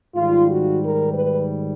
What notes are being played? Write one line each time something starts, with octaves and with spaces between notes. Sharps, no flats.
G#2 D#3 G3 F4
F#4
A#4
B4